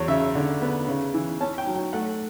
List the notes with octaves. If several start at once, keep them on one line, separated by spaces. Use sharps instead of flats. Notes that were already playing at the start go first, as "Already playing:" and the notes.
Already playing: E2 F#3 C#5
C#3 E5
D3
B3
C#3
E3
C#4 A5
G5
F#3
G5
A3 F#5